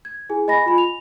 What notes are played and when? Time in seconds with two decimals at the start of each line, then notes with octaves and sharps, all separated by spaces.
0.05 G#6
0.29 E4 G#4 G#5
0.48 D#5 G#5 B5 A#6
0.66 F4 G#5 B5
0.78 F7